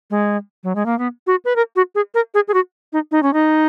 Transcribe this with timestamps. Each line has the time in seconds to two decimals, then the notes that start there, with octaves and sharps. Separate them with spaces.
0.10 G#3
0.64 F#3
0.75 G#3
0.86 A#3
0.99 B3
1.27 F#4
1.45 B4
1.56 A#4
1.76 F#4
1.95 G#4
2.14 A#4
2.34 G#4
2.48 G#4
2.54 F#4
2.93 D#4
3.11 D#4
3.23 C#4
3.33 D#4